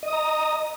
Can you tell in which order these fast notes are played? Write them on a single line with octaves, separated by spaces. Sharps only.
D#5 D#6 A#5